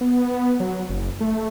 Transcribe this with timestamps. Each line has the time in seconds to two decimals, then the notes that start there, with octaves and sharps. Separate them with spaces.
0.01 B3
0.60 F#3
0.89 F#1
1.21 A3